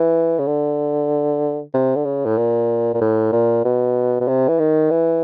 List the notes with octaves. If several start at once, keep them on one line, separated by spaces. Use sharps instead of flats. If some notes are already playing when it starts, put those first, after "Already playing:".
Already playing: E3
C#3
D3
C3
D3
C#3
A2
A#2
A#2
A2
A#2
B2
B2
C3
E3
D#3
E3